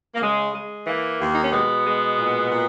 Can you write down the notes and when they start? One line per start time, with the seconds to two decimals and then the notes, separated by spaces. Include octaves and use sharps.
0.15 A#3
0.21 C#3 G#3
0.55 G#3
0.86 E3 A#3
1.20 D#2
1.34 D#4
1.43 C#4
1.52 B2 G#3 B3
1.85 G#3
2.17 A#2
2.50 A#2